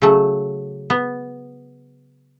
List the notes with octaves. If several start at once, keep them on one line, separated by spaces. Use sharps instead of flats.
C#3 F#3 A3
B3